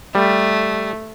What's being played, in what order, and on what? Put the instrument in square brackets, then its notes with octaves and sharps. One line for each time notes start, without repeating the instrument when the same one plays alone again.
[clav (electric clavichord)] G3 [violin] A3